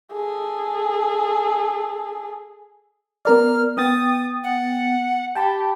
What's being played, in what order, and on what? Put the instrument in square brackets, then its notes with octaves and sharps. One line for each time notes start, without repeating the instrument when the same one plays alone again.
[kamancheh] G#4 A4
[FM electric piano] B3 A#4 D5 [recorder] F6
[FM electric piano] B3 G5 A6 [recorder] D#6
[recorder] F#5
[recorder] G4 [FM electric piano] G5 A5 B5